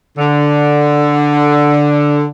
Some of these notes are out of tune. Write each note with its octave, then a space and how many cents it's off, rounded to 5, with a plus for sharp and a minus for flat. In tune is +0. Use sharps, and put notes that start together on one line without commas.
D3 +0